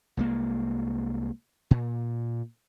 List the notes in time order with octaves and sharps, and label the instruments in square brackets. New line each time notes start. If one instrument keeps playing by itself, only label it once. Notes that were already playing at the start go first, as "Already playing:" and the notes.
[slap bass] C2 G#3 A#3
A#2